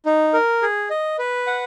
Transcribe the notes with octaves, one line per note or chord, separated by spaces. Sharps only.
D#4
A#4
G#4
D#5
B4
F#5